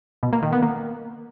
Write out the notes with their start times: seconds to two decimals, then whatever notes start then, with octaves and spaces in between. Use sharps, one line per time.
0.23 B2
0.33 A#3
0.43 D#3
0.53 B3
0.62 A#3